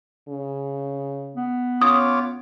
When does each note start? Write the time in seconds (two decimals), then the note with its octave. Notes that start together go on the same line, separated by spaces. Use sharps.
0.28 C#3
1.36 B3
1.81 C#4 F4 C#5 D6 D#6